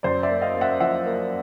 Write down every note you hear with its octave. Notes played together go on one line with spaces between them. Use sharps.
F#2 C5 D5
D5 E5
A#3
D#5 F5
A#3
E5 F#5
F3 E5 F#5
A#3